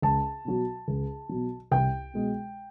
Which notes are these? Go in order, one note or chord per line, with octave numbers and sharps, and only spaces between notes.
C#2 A5
B2 F#3
C#2
B2 F#3
C2 G5
B2 G#3